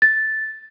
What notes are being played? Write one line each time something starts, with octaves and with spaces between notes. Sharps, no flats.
A6